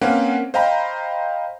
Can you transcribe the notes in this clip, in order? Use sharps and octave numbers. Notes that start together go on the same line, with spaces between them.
A#3 C4 C#4 B4 F5 F#5
C5 D#5 F5 G5 A#5 B5